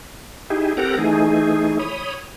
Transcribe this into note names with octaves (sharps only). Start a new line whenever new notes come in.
D#4 E4 G4 G#4
C4 G4 A4 A#4 F#5 A#5
E3 A3 D#4 G#4
C#5 B5 D#6